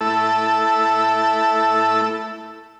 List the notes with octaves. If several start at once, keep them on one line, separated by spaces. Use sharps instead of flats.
A3 E4 A4